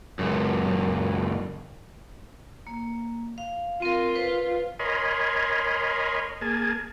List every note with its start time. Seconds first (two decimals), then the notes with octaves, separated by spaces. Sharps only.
0.19 C#2 F#2
2.67 A#3
3.38 F5
3.82 C4 F4 A#4
4.15 B4 C5
4.79 A#4 C#5 D#5 G#5 B5 C6
6.41 A#3 G#4 G#5 A5